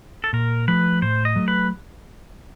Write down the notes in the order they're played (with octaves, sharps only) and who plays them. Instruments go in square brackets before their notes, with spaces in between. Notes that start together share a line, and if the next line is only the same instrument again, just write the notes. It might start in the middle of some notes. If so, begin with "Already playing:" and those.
[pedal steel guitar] A4
[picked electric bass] A#2 [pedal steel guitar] A#4
[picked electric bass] F3 A3 [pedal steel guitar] B4
[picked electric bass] A2 [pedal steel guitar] C5
[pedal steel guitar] D#5
[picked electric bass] F#3 A3
[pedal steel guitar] B4